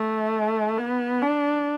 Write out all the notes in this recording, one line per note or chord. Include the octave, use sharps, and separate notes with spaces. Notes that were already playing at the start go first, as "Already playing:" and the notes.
Already playing: A3
B3
D4